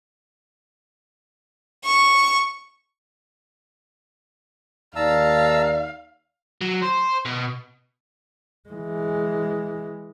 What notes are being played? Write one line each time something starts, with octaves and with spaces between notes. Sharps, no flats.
C#6
D#2 D5 F5 A5 A#5 E6
F#3
C5
B2
E3 G#3